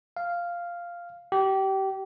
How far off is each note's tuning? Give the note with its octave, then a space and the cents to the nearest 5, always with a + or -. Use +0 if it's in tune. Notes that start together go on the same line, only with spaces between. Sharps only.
F5 -5
G4 -25